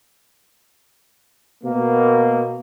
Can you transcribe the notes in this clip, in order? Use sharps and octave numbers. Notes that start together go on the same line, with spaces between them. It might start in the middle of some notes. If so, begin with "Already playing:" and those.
B2 A#3